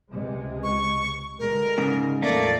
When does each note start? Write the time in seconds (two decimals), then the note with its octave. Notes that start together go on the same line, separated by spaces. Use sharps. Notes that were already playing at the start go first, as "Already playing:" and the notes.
0.11 C#2 C3 G#3
0.63 C#6
1.39 B2 D3 G#3 A#4
1.78 G#2 C#3
2.22 A#1 F2 F3 A3 A#3 D5